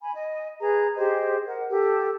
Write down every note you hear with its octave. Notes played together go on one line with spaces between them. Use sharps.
G#5 B5
D#5
G#4 B4 A#5
G4 G#4 C5 D#5
A#4 F#5
G4 A4